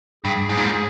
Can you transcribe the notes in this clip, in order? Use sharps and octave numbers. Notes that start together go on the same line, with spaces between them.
G2 G#4
G#2
A#2
G#2